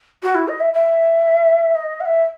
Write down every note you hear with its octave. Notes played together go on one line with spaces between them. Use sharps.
F#4
E4
D#5
E5
E5
D#5
F#5
E5